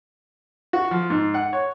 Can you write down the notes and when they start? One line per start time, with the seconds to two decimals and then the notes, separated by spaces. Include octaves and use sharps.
0.73 F#4
0.91 F3
1.10 G#2
1.34 F#5
1.53 C#5